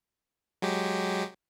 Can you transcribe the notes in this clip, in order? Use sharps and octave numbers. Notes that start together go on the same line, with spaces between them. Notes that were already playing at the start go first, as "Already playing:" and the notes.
F#3 G#3 G4